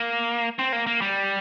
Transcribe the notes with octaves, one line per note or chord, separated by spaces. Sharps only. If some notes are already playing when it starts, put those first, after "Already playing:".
Already playing: A#3
C4
A#3
A#3
G3